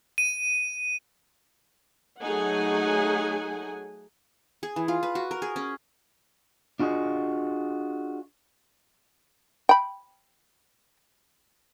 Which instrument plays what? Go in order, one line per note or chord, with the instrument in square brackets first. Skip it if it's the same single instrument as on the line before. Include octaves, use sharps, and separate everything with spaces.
[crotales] D#7
[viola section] F#3 A3 D#4 G#4 F#5 G#5
[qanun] G#4
E3
F4
B4
F#4
A#4
G#4
C#4
[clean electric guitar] D4 F4 F#4 G#4 D#5
[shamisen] G5 B5